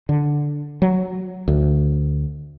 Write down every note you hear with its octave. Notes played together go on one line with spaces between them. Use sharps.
D3
F#3
D2